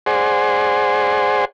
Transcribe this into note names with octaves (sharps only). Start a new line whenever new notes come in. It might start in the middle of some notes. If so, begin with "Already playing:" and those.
G#4 C5 D5 F#5 G#5 C6